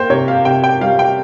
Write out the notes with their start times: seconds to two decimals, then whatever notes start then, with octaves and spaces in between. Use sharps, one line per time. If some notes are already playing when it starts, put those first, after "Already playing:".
Already playing: A#3 C5 G5
0.10 C3 C#5
0.28 F5
0.45 C3 G5
0.64 G5
0.81 G3 F5
0.99 G5